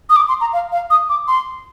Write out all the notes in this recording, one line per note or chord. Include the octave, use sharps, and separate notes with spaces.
D#6
D6
C6
A#5
F5
F5
D#6
D6
C6